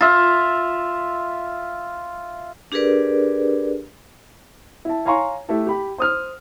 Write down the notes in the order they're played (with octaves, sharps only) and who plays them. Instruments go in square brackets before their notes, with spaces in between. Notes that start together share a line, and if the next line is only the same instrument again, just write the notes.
[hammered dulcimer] F4 E5
[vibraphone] D4 G4 G#4 A#4 B4 D5
[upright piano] E4 A5
C#5 F5 G#5 A#5 C6 C#6
A3 E4 G4 A4
G4 B5
C5 D#6 F6